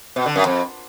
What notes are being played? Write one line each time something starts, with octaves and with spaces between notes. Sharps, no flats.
B2
D3
F#2
F2